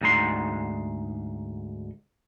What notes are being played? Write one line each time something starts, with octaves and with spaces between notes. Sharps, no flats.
D2 G#2 D#4 C6